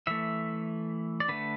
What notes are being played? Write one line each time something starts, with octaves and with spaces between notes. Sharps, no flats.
E3 A3 E5
D5
D3 A3 B4